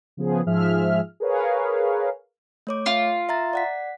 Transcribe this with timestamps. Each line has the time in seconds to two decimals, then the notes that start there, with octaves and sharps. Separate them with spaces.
0.17 C#3 F3 B3 G#4
0.46 G#2 F3 G#4 E5 F6
1.20 G#4 A#4 B4 C#5 F5
2.67 A3 C#5 D6
2.86 F4
3.29 E5 A#5 A6
3.53 D5 F#5 B6